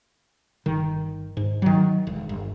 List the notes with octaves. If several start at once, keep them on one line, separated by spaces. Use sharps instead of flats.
G1 D#3
G#2
D#3 F#3
E1
G1